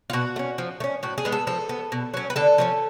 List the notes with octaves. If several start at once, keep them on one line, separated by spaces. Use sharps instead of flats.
F4
B2 F#4
A3
C#4
F3
A3
C#4
A2 F#4
G#4
G#3 B3
A4
F3 A4
B3
B2
F#3 C#4
B4
D3 A4
F3 A3 C#4